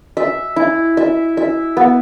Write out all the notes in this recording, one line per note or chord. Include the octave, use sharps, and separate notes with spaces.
E5
E4
E5
E5
B3